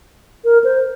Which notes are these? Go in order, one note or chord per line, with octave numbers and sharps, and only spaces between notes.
A#4
C5